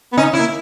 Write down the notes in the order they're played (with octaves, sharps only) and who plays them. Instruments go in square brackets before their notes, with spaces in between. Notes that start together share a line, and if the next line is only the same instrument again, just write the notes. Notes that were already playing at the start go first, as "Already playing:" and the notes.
[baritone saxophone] B3
[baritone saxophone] C#4 [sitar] D#4
[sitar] E4
[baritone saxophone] A#3